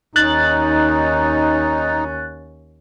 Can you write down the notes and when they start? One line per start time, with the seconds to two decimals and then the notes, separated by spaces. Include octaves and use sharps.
0.16 D#2 C#4 D#4 F#6 A6